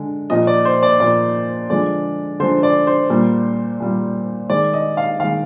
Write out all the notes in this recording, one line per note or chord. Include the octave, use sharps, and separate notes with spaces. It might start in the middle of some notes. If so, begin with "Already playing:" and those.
Already playing: D3 G#3
A#2 F3 A#3 D#5
D5
C5
D5
A#2 F3 A#3 D5
D3 F3 G#3 D5
D3 F3 G#3 C5
D5
C5
A#2 G3 A#3
A#2 G3 A#3
D#3 G#3 D5
D#5
F5
D#3 G#3 F5